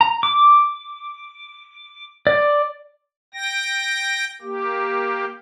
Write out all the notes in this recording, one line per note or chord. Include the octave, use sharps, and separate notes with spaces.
A#5
D6
D5
G5 A#6
A#3 G4